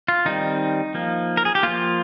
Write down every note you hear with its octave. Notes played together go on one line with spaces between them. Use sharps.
F4
D#3 G3 C4 D#4
F3 A#3
A#4
G#4
G4
F3 A#3 F4